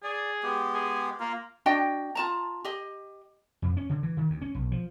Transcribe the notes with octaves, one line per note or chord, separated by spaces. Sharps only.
G#4 D5
G#3 B3 G4
G#4
A#3 F4 A#4
D4 F#4 D#5 G5
F4 A5 A#5
G4 D#5
F2
C#4
D3
E3
D#3
D2
C#4
B1
F3